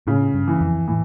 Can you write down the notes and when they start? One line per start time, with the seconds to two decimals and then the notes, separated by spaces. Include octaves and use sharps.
0.07 A2 C#3
0.34 G2
0.47 E3
0.61 F2
0.88 A2 E3